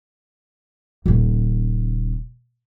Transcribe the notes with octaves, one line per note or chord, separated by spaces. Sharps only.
D#1 C#3